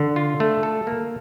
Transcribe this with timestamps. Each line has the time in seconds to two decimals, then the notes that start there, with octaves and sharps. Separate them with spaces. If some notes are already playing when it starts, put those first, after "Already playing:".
Already playing: D3
0.16 F4
0.40 A3
0.63 A4
0.87 A#3